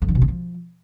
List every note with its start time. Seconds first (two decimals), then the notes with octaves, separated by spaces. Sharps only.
0.02 F2
0.08 D3
0.15 B2
0.22 D#3
0.28 F3